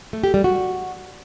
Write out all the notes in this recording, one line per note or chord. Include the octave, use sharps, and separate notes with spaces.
A3
G4
G3
F#4